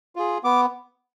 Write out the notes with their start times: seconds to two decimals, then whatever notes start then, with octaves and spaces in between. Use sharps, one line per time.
0.16 F4 G#4
0.44 B3 D6